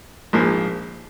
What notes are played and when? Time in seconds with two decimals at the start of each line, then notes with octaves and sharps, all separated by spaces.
0.33 A#1 G#2 F3 A#3